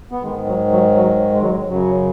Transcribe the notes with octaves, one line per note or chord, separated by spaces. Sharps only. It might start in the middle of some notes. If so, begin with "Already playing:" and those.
B3
G#2 D#3 G#3
F#3
F#3
F#3
G#3
F#3
G#3
F#2 C#3 F#3